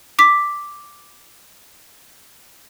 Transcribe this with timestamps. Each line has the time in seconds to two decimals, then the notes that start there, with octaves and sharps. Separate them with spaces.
0.19 D6 B6